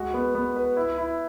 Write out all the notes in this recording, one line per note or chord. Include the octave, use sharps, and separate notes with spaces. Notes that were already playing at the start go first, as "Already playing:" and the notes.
Already playing: G#3 F#4
B3
B3
B4
E4
E4